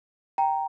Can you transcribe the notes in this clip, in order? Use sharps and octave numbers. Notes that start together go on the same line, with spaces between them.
G5 A#5